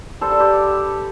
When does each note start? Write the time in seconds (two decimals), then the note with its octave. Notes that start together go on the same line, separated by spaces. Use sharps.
0.21 G3 A4 C5
0.32 A4
0.40 G4 B4